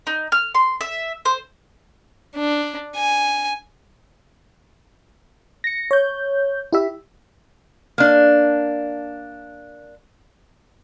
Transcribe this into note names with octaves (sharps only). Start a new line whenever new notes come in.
D#4
F6
C6
E5
C5
D4
G#5
A#6 C#7
C#5 G6
E4 G4 E5
A#3 D4